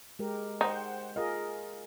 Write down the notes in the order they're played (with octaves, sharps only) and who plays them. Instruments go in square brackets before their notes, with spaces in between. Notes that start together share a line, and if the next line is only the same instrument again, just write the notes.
[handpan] G#3 G4 A#4
[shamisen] D#4 [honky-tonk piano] C5 F#5 G5
[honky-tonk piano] F4 [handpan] G#4 A#4 D#5